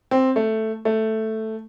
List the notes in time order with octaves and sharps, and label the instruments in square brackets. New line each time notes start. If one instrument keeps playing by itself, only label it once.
[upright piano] C4
A3
A3